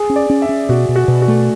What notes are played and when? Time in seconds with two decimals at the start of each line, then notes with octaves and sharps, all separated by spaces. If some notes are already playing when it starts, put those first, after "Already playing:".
Already playing: G#4
0.10 C#4
0.16 D5
0.30 C#4
0.42 E5
0.49 C#4
0.69 B2 F#4
0.89 B2
0.96 F#4
1.08 B2
1.22 F#4
1.28 A3